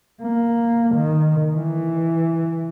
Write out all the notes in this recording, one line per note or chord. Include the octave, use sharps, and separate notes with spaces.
A#3
D#3
E3